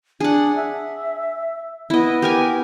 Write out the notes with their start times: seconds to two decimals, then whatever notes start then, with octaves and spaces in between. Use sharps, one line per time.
0.20 D4 G#4 F#5
0.56 E5
1.90 B3 E4 D#5
2.22 G4 A#4 G#5